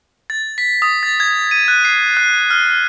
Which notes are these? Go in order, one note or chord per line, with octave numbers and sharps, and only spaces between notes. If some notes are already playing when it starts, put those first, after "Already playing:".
A6
B6
D#6
A6
G#6
D#7
F#6
C7
F#6
F6